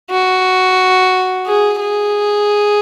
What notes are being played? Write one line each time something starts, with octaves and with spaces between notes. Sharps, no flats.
F#4
G#4
G#4